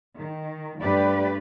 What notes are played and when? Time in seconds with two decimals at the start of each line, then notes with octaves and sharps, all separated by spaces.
0.18 D#3
0.80 G2 A3 G4 B4 D5